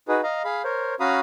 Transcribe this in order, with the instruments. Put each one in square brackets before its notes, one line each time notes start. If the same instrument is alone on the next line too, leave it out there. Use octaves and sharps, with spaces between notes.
[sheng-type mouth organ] D#4 F#4 G#4 B4
D#5 F5 A#5
G#4 F5 B5
A#4 C5 C#5
C#4 F#4 F5 A#5 B5 D#6